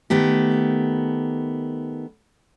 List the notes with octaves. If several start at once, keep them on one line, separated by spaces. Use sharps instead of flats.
D#3 A3 B3 G4